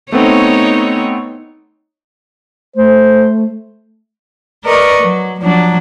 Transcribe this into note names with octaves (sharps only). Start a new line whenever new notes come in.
A3 B3 C4 D#4 C#5
A3 C5
A#4 B4 D5 D#5 C#6
F#3
F3 F#3 D4